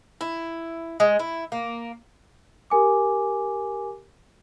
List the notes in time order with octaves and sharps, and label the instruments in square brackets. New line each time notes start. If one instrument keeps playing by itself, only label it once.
[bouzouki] E4
G#3
E4
A#3
[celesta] G4 A#4 G#5 D6